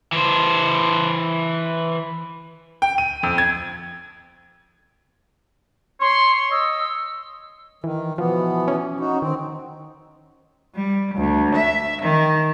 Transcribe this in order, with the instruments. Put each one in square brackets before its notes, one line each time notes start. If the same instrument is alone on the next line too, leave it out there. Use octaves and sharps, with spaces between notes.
[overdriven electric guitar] E3 C5
[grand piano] G5
D#7
F2
G#6
[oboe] C#5 [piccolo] C6
[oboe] D#5 [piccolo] E6
[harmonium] D#3 [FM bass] E3
[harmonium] B2 E3 B3 [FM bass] F3
[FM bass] C#4
[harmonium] D#4 F#4
[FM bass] D#3 [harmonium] C4
[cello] G3
D2
E5
D#3